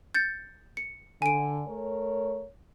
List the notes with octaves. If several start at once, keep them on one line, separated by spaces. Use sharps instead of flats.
G6 A6 C#7
C#7
D3 G#5 D7
A3 A#4 C#5